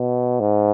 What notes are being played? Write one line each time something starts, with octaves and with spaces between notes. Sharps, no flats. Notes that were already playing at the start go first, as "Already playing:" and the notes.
Already playing: B2
G#2